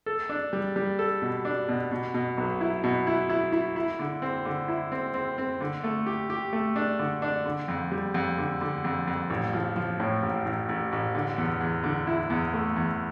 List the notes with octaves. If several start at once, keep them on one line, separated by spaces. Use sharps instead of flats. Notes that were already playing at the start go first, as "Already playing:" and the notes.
A4
D4
G3
G3
A4
B2
D4
B2
B2
B2
B1
E4
B2
E4
E4
E4
E4
D3
C4
D3
E4
C4
C4
C4
D3
A3
G4
G4
A3
D4
D3
D4
D3
F2
G3
F2
D3
D3
F2
F2
A1
F3
F3
A2
A1
A1
A1
A1
D3
E2
E2
D3
E4
E2
A3
E2